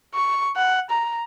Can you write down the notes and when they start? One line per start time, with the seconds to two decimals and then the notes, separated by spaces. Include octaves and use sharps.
0.14 C#6
0.57 F#5
0.90 A#5